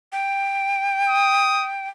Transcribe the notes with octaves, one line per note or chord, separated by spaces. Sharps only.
G5
D#6